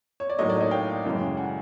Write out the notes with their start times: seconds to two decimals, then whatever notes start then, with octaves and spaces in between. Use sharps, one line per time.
0.20 C#5
0.30 D5
0.39 A2 F#3 A#3 D#4 C#5 D#5
0.50 D5
0.61 C#5 D#5
0.71 F5 G5
1.05 F#2 C#3 E3 G#3 C#4
1.37 F#5 G#5